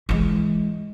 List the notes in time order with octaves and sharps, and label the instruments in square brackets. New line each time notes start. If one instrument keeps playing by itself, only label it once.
[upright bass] E3 G#3